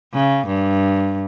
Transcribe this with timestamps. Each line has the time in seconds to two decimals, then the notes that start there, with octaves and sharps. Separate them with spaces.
0.13 C#3
0.47 G2